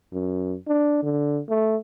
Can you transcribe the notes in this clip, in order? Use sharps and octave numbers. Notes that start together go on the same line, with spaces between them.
F#2
D4
D3
A3